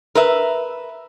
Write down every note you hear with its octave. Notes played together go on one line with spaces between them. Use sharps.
A#4 B4 E5